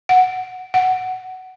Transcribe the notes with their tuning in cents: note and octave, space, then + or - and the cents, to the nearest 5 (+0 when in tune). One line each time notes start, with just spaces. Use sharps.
F#5 -5
F#5 +5